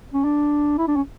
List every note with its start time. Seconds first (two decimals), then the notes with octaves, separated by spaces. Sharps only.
0.14 C#4
0.24 D4
0.78 E4
0.87 D4
0.96 C#4